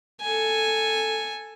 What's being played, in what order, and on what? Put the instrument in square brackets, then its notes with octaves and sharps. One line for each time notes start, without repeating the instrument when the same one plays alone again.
[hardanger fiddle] A4 G#5